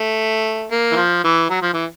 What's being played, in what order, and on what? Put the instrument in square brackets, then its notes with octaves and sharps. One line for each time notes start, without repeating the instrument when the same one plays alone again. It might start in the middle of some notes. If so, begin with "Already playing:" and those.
Already playing: [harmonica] A3
A#3
E3
F3
E3
F#3
F3
E3